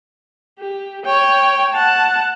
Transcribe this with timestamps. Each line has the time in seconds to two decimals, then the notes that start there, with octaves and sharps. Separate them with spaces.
0.59 G4
1.05 C#5 G5
1.73 F#5 A5